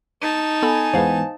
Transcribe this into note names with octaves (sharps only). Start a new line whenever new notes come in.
D#4 A5
B3 A4 G#5 B5
E2 G#2 B3 C5 F5